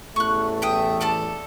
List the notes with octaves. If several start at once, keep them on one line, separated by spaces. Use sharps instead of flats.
A1 E2 A3 C#6 F#6
E5 G5 D#6
A4 D5 A5